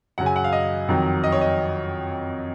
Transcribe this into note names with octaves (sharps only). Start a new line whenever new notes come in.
F#2 C#3 F#3 F#5
G#5
F#5
F5
D#5
F2 D#3 F#3
D#5
C#5
D#5